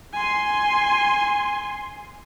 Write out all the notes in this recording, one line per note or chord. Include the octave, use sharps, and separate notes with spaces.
G#5 C6